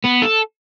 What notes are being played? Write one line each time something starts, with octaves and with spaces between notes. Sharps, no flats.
B3
A4